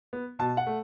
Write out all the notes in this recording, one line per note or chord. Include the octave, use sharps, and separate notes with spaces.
B3
B2 A5
F#5
A3